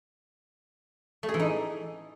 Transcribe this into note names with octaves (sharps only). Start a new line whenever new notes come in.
A3
G#4
E3
D#4